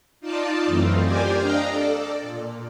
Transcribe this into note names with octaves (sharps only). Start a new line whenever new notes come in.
D#4 F4 D5 A5
F#2 E3 A3 C4 D#4 F4
G4 A#4 C5 D5 G#5
D4 D#5 F5 G5 A#5
A4 D5
A#2